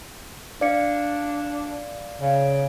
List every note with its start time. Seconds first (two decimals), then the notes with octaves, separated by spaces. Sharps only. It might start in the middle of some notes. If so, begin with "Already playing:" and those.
0.61 D4 D5 F5 C#7
2.20 C#3